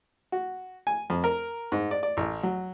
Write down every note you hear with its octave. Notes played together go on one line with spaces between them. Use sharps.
F#4
G#5
F2
A#4
G#2
D5
D5
A1
F#3